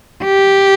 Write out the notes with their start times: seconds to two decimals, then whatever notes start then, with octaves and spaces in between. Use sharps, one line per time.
0.24 G4